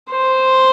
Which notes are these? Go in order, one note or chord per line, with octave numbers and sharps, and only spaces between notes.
C5